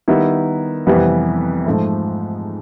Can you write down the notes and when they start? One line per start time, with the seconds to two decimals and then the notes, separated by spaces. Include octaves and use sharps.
0.08 D#3 G3 B3 E4
0.87 F2 C3 E3 G3 B3
1.66 G#2 F3 A3